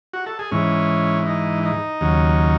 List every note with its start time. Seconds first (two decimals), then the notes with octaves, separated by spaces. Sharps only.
0.13 F#4
0.26 A4
0.39 G#4
0.52 G#2 E3 C#4
1.27 D#4
1.63 D#4
2.01 D#2 C#3 F#3